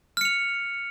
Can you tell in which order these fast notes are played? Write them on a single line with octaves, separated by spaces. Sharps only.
F6 C#7 F7